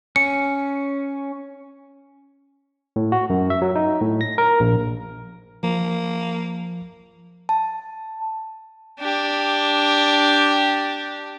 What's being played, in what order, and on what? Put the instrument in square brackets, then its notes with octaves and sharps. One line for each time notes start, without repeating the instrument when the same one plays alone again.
[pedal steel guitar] C#4 [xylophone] C#7
[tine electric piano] A2
F#4
F#2
E5
F#3
D#4
A2
A#6
A#4
A#1
[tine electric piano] F3 [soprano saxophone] A#3
[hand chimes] A5
[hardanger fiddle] D4 G4